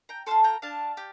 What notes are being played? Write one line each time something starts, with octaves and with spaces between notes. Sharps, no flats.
G5 A#5
F4 A4 A5 C6
G5 A#5
D4 F5 A5
G4